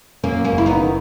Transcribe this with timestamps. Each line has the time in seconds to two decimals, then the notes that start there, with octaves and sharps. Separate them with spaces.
0.23 F#2 A#3 C#4
0.44 A#3 C#4
0.52 F#1
0.58 E4
0.66 B3 D#4
0.81 D#3